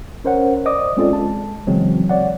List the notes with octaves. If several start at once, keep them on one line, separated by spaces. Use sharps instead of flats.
C#4 A#4 C5 C#5 F#5
C5 D5 D#5 D6 D#6
G#3 C4 C#4 F4 A4 D5
G#3 A5
C#3 E3 F#3 G#3 C4
C#5 D5 F#5